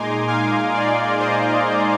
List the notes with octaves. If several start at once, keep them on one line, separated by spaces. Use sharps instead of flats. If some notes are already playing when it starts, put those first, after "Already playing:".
Already playing: A#2 G#3 D#4 G#5 A#5 C6 D6
F5 G#5
D5 F5
C5 D#5